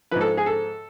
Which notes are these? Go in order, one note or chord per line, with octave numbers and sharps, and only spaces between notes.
G#2 F3 B4
A4
G#4
A4